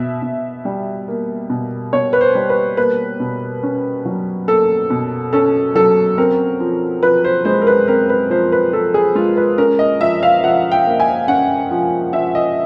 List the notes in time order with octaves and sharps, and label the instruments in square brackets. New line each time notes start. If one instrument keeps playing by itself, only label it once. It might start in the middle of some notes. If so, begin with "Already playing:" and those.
Already playing: [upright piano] B2 E5
B2
G3
A#3
B2
B2 C#5
B4
C5
G3
B4
A#3 B4
B2
C#4
F#3
A#3 A4
B2
C#4 A4
F#3 A4
C4 A#4
F3
F3 B4
C5
G#3 C5
A#4
B4
C4 A#4
B4
F3 C5
B4
F3 A4
G#4
G#3 F4
B4
C#4 A#4
D#5
F3 E5
F5
F3 F#5
G5
A#3
G#5
C#4 F#5
F3
F3 E5
D#5